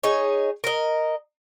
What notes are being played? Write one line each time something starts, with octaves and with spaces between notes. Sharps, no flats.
D#4 G#4 C#5
A#4 D#5